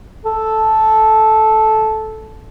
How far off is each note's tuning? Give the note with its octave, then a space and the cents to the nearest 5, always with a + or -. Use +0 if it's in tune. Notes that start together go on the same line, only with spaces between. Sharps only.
A4 -10